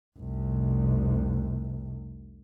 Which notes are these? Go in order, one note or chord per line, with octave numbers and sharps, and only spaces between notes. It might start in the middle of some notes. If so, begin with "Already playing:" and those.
F1 C2